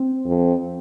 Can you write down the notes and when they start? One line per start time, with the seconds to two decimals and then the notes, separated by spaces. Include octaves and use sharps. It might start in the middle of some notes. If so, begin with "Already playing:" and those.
Already playing: C4
0.26 F2